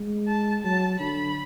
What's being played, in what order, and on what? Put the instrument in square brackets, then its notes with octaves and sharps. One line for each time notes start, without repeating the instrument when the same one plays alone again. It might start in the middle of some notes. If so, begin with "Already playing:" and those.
Already playing: [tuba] G#3
[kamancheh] A5
[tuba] F#3 [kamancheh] A5
[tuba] D3 [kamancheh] B5